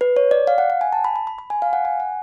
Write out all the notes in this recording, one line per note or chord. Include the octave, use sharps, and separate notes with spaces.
B4
C#5
D5
F5
F#5
F#5
G#5
A5
B5
B5
B5
B5
G#5
F5
F#5
G#5
F#5